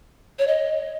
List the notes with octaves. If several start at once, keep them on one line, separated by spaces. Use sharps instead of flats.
C#5
D#5